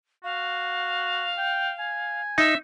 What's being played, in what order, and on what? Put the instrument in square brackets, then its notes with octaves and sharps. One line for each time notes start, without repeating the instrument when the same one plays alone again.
[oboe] F#4 [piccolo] F5
[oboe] G5
G#5
[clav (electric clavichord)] D#4 [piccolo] E5